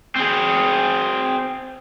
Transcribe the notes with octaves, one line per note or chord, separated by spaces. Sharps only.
C4 G#4